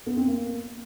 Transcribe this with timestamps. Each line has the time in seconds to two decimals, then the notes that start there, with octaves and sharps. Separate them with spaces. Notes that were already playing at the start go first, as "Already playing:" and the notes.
0.06 B3
0.17 C4
0.27 A#3